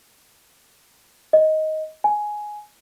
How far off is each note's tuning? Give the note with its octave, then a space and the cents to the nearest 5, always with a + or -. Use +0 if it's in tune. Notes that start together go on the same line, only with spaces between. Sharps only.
D#5 +10
G#5 +10